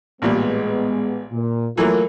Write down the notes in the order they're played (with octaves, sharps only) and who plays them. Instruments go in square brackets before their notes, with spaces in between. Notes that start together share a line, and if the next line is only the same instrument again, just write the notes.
[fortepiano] A1 A#2 G3 [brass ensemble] G#3 B3
[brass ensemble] A#2
[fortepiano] E3 F#3 A#3 [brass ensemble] A3 F4 A#4